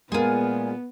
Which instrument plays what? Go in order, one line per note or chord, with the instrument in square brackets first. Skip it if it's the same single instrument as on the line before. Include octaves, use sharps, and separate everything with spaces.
[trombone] A#2 [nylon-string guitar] G#3 A#4 [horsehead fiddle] B3 [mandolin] F4 G#4